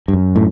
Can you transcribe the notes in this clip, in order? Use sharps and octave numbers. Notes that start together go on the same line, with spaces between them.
G2
F#2
A2